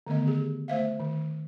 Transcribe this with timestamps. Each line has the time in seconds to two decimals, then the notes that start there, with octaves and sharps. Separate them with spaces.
0.07 D3 D#3 A3 B3 D#5
0.26 G4 G#4
0.68 A3 C5 E5 F5
1.00 D#3